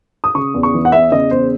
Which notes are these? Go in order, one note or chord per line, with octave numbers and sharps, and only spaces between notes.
D#6
C#3 C#6
E2
C#6
E3
F#5
E2 E5
C#3 D#5
E2 C5